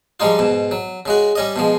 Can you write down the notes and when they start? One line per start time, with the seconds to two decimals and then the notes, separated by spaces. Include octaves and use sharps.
0.20 F3 G3 G#3 D#4 F4
0.39 G#2 B2
0.71 F#3
1.06 C#3 G#3 F#4
1.36 G3 C#4 D#5
1.56 B2 F3 G#3